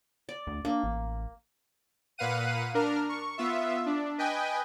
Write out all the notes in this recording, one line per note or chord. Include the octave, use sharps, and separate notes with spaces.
D5
D2
A#3 D4
A1
A#2 B4 F5 F#5 D#7
D4 A#4 F6
C#6
B3 F4 E5
D4
B4 D#5 G5 G#5